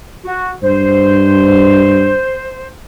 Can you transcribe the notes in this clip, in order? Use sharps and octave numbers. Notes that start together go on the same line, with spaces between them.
F#4
G2 C5